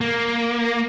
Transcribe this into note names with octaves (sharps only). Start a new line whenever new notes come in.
A#3